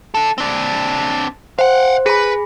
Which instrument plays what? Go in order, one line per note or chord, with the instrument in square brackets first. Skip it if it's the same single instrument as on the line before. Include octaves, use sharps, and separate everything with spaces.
[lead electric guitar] D4 A4
C4 D4
[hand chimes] C5 [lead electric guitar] F5 F#5
[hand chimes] G#4 B5 [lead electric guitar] B4